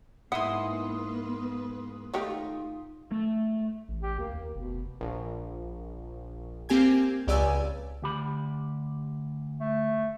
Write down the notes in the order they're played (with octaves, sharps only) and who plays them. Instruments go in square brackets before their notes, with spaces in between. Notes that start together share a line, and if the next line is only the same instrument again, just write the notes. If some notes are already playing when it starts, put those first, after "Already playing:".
[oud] G#2 E4 [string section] A#3 B3 B4 [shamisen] F#5 [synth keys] C6 D#6
[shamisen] D#3 A3 G4 [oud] D#4 F4
[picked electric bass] A3
[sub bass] A1
[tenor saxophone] G4
[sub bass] D2 [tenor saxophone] A#3
[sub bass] D#2
[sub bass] F1 [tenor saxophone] B2
[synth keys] A#1
A#3 C4 G4 G#5 G#6
C#2 G4 D5 G#5 E6
[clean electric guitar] D2 G4 B5
[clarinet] A3